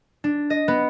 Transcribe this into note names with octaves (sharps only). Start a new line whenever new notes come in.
D4
D#5
B3